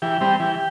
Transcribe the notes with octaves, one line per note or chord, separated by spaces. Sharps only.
E3 G4
G3 C4
E3